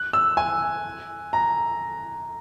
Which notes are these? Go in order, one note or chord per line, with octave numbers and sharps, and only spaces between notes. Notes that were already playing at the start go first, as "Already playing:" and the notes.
Already playing: F#6
E6
G#5
A#5